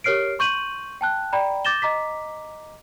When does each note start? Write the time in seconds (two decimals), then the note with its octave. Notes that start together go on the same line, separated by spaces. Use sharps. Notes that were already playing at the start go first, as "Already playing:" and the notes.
0.04 G4 A#4 C#5 F6 C7 D7
0.39 C6 C#6 G6 D#7 F#7
1.01 G5 A5 F#6
1.33 D5 G5 A#5 B5
1.65 D6 G6 A6 A#6 E7 G7
1.82 D#5 A#5 D6 B6